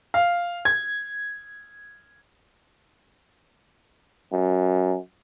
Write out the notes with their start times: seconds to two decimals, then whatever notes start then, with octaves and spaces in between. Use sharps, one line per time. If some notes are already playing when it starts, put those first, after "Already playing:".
0.14 F5
0.65 G#6
4.32 F#2